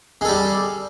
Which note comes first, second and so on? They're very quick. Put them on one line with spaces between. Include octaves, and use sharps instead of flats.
G#3 A4 G3